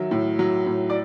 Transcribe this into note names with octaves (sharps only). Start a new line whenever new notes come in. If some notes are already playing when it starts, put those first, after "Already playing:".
Already playing: D#3 F#3 E5
A2
F#3
A2
D5